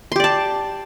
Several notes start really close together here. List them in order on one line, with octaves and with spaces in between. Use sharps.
C6 G4 D5 A5